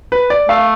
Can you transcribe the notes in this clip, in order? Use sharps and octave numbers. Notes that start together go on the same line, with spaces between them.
B4
D5
A3 F5